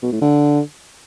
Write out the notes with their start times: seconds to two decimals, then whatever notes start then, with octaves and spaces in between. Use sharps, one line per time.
0.02 B2
0.12 A2
0.22 D3